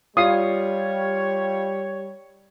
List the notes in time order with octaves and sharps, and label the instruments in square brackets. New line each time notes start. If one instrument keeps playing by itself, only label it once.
[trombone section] G3 [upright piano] F4 C7 [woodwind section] C#5 [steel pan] D#6